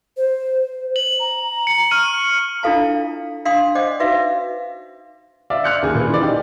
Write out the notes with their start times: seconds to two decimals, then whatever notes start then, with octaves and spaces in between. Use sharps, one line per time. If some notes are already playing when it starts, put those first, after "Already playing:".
0.17 C5
0.96 F#7
1.20 A#5
1.67 C#7
1.91 C#6 F6 D#7
2.63 D4 E4 F4 A4 F5 A5
3.45 D4 F5 G5 C6 D#6
3.75 C5 D5 D#5 F#5 G5 D6
4.00 D#4 F#4 B4 E5 F5
5.50 D5 E5 F5
5.64 F6 F#6 C#7
5.82 D#2 G#4
5.95 A#2 B4
6.09 E3 D5
6.21 D#4 G4 G#4